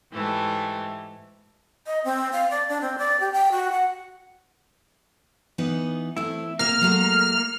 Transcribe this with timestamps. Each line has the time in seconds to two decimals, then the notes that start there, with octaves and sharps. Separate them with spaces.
0.13 G#2 E3 A3 G4
1.87 D#5
2.04 C4
2.33 F5
2.51 D5
2.69 D4
2.81 C4
2.98 D5
3.20 G4
3.32 G5
3.52 F#4
3.72 F#5
5.58 E3 B3 D#4
6.17 A3 C4 E4
6.59 C3 A#3 A#4 F6
6.81 F#3 G#3 A3